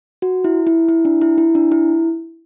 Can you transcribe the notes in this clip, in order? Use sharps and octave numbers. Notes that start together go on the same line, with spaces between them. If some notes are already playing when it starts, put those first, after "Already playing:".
F#4
E4
E4
E4
D4
E4
E4
D4
E4